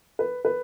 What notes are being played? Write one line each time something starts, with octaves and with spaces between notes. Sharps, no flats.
B4
B4